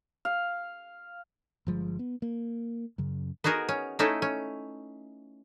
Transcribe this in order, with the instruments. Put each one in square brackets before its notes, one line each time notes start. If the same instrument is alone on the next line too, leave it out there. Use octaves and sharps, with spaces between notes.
[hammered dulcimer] F5
[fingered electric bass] G1 F3 G#3
B3
A#3
F#2 C#3
[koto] B3 D#4 F#4 G#4 A#4
C#4
A3 C#4 D#4 E4 A4
C#4